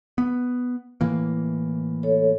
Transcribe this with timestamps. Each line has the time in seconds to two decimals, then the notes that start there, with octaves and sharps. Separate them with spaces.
0.18 B3
1.01 A2 E3 A#3
2.03 A4 C#5